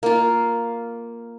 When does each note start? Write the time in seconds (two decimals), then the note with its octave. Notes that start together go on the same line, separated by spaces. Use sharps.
0.03 A#3 F4